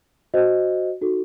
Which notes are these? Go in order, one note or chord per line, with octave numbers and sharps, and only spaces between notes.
F#4 C5 D#5
D#4 F#4 A4